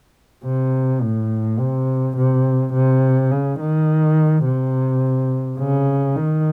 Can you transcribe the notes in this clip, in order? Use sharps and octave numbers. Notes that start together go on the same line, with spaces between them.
C3
A2
C3
C3
C3
C#3
D#3
C3
C#3
D#3